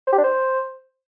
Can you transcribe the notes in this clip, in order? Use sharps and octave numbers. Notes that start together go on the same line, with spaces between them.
C5
G4
D4
C5